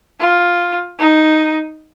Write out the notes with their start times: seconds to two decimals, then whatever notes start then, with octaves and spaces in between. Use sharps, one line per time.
0.20 F4
0.99 D#4